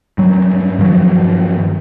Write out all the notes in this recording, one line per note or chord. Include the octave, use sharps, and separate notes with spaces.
G2 F#3
G2 D#3 F3 F#3